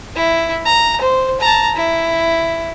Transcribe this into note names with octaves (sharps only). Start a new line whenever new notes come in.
E4
A#5
C5
A5 A#5
E4